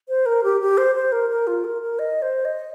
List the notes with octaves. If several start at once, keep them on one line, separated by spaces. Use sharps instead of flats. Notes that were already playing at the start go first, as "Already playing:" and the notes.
C5
A#4
G4
G4
C5
C5
A#4
A#4
F4
A#4
A#4
D#5
C5
D#5